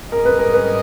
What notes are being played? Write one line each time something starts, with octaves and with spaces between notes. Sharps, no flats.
G#2 G3 C#4 G#4 A#4 D#5
B4
A#4
B4